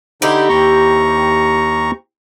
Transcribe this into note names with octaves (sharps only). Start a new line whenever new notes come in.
D3 C4 D#4 E4 G4
D#2 A#5 C#6